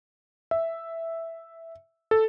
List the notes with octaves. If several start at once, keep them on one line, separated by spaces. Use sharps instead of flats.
E5
A4